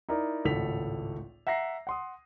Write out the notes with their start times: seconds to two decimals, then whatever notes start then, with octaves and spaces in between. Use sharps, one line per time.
0.09 D#4 E4 A#4 D5
0.45 G#1 C#2 A2 A4 B6 F7
1.47 E5 F#5 A#5 A#6 C7
1.87 F#5 C6 D#6